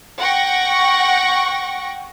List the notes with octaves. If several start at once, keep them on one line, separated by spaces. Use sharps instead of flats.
F#5 G5 C#6 A#6